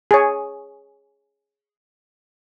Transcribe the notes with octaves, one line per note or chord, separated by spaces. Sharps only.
G#4 C#5